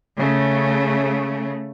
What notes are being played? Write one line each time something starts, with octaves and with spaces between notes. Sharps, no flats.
C#3 A3